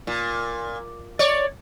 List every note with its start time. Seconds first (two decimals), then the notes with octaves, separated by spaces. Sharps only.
0.07 A#2
1.19 C#5 D5